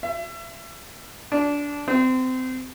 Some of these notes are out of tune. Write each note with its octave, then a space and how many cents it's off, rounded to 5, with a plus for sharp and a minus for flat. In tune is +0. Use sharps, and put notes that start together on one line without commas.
E5 +35
D4 -20
C4 -25